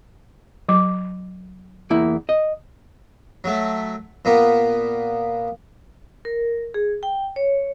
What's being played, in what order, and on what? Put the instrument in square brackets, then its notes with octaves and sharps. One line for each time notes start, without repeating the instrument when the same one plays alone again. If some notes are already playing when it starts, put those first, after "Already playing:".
[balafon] F#3 D6
[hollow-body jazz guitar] E2 A#3 E4
D#5
[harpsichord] F#3 A3
A#2 A#3 B3
[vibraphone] A#4
G#4
G5
C#5